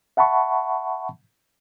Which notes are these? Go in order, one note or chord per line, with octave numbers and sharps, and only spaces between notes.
E5 F#5 A5 B5 C#6